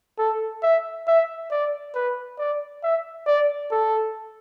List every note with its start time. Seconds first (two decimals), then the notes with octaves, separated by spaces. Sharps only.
0.19 A4
0.63 E5
1.08 E5
1.51 D5
1.94 B4
2.38 D5
2.83 E5
3.27 D5
3.71 A4